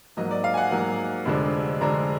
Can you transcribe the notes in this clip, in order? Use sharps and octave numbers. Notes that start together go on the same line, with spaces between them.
G#2 F#3 A#3 D#5
D5
F5
G#5
F#5
G#2 F#3 A#3 G#5
F1 F2 D3 G#3 D4
F1 F2 D3 G#3 D4 A#5